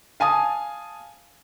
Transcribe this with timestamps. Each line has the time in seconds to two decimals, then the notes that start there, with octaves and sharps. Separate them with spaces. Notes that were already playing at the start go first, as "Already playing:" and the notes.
0.20 F5 G#5 A5 D#6